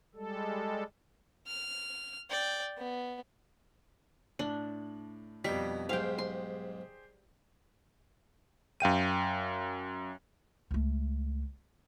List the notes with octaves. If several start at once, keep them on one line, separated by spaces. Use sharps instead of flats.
G3 G#3 A4
F6
D5 G5
B3
A2 D4 F#7
F2 B2 G3 D#4 A#5 B6
B1 G#2 G4 G#4 C5 F5 G5
C6
F#2 F5 G5 D#7
C#2 A3